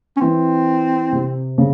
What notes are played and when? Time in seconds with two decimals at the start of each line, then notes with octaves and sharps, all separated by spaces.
0.17 C#4
0.21 E3 C4
1.13 C3
1.58 C#3